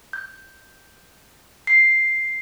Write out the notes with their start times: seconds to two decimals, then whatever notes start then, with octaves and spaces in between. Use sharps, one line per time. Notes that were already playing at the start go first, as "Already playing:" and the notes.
0.13 G6
1.67 C7